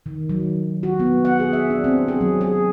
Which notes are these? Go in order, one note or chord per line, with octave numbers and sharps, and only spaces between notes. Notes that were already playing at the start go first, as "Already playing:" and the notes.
D#3
F#3
F#4
B3
F#5
G#4
E5
D4
C4
G#4
F#3
G#4